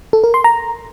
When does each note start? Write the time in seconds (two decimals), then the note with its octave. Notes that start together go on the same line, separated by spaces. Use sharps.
0.13 A4
0.24 A#4
0.34 C6
0.44 A#5